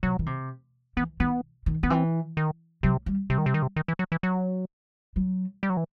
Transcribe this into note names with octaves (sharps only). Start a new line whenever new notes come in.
C3 F#3
D#3
C3
E3 B3
D#3 B3
D#3
D#3 B3
E3 C4
D#3
C3 F#3
G3
C3 G3
D#3
C3
D#3
C3
D#3
E3
F#3
E3
F#3
F#3
G3
F#3
E3